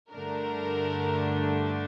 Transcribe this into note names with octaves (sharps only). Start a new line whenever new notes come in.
G2 D3 A3 D4 A#4